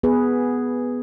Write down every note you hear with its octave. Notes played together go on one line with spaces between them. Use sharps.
B3 G#4 B4